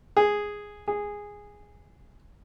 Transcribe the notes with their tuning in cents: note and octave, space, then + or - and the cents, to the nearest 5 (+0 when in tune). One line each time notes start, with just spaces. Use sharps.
G#4 -5
G#4 -10